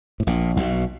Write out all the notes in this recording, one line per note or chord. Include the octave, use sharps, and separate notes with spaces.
A2
A#1 A#2
B1 B2